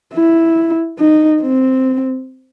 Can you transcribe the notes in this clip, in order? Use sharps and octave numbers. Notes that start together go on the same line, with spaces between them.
E4
D#4
C4